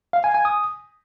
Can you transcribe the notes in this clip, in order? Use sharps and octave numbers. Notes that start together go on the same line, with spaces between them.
F5
G#5
G#5
D#6